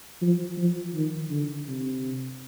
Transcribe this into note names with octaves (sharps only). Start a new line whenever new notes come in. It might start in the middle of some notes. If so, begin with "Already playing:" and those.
F3
F3
D#3
D3
C3